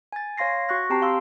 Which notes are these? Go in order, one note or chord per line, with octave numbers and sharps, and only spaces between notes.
G#5 A6
C#5 F5 C6 A#6 C7
F#4 C#6 F#6 A#6
C4 G4 G5 A5 A#5 C7
F5 C6 E6